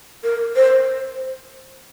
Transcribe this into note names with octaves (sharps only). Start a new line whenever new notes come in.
A#4
C5